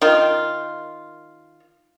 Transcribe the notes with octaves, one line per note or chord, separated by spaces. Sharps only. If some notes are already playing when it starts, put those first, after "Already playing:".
D#3 F4